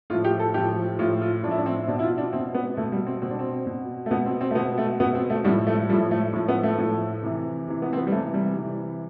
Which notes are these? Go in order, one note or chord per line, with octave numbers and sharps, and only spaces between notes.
A2 F3 F4
G4
A4
A2 F3 G4
A2 F3 F4
F4
A2 F3 D4 E4
D4
C4
B2 D4
E4
F4
D4
B2 C4
B3
B2 A3
G3
C4
B2 C4
D4
C4
B2
A3
B2 B3
C4
C4
A3
B2 B3
A3
B2 B3
C4
A3
A2 F3 G3
A3
A2 F3 G3
A3
A2 F3
B3
A3
A2 F3
C3 E3
C3 E3
B3
C4
B3
G3
C3 E3 A3
G3
C3 E3